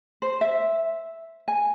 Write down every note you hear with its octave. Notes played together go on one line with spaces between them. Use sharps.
C5
E5
G#5